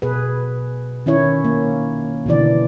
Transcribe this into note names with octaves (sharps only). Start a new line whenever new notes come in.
B2 G#4 B4
D#3 C#4 E4 C#5
A#3
B2 D3 E3 D5